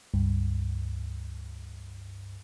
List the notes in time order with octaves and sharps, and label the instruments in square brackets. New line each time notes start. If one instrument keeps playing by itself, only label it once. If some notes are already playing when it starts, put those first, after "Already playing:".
[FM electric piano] C#2 G2